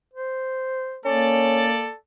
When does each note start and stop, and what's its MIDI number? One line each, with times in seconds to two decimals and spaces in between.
0.14 0.99 72
1.05 1.88 58
1.05 1.69 61
1.05 1.96 69
1.05 1.96 74